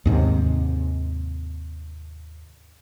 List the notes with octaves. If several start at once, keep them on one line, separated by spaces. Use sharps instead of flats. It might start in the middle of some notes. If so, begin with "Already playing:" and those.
D#2 G#2 C3